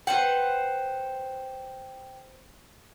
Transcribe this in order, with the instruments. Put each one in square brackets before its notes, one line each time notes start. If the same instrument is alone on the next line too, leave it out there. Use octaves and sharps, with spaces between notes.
[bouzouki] B4 C5 F#5 [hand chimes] G5